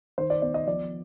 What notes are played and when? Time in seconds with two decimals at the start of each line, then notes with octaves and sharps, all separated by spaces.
0.18 D#3 C5
0.30 D5
0.42 B3 D5
0.54 D#5
0.67 F3 D5